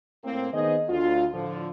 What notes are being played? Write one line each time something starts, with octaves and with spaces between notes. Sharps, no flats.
A2 A#3 C4
D#3 B3 D#4 G#4 C5 D#5
D2 F4
A2 D3 F3